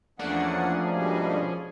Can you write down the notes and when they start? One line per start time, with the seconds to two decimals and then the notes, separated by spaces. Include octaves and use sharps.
0.19 E2 F3 A3 A#3 C#4 D4 G#4 F#5
0.95 G#2 B2 G3